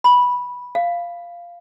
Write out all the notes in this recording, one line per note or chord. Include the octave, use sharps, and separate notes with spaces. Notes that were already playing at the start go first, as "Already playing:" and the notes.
B5
F5